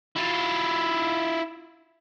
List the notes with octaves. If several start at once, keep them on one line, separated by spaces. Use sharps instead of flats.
E4 F4